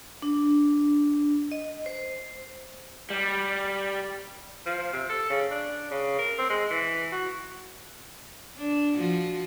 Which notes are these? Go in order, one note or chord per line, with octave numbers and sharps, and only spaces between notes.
D4
D#5
C5
G3
F3
C3
A4
C#3
D4
C#3
A#4
C4
G#3
E3
F#4
D4
F3 F#4